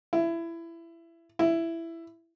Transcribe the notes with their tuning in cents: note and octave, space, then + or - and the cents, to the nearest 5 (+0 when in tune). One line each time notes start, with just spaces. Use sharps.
E4 +20
E4 +10